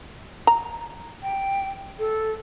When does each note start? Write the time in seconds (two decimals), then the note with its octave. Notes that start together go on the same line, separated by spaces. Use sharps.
0.47 A#5
1.23 G5
1.99 A4